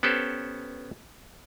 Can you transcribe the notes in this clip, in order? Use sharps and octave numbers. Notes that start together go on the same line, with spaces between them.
B3 C#4 G4 A4 C5